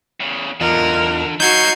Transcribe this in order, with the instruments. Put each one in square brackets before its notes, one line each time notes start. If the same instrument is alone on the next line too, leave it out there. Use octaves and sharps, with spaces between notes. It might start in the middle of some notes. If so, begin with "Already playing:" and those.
[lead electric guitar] E2 C#3
[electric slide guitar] E2 F4 D#5 [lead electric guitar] D3 [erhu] A#4
[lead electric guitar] F#3 A#3 [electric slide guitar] D#4 [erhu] F#4 [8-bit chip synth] G6 G#6 C7